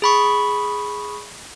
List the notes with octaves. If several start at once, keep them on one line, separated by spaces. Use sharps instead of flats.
G#4 B5 C#6